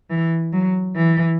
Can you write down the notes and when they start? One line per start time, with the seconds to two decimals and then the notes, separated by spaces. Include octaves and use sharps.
0.10 E3
0.53 F#3
0.96 E3